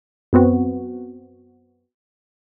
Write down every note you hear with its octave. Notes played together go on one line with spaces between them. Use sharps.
F#2 B3 C4 F#4